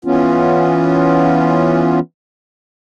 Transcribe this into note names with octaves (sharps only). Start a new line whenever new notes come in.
E3 B3 C#4 F4